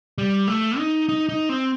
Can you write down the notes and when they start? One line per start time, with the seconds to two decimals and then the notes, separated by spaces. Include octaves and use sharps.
0.18 G3
0.48 A3
0.78 D#4
1.09 D#4
1.29 D#4
1.49 C4